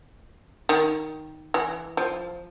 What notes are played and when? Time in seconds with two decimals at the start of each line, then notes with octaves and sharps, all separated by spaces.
0.69 D#3
1.54 E3
1.97 F3